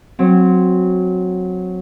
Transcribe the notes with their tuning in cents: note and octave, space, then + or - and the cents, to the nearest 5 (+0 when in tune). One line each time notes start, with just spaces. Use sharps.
F#3 -10 C4 +0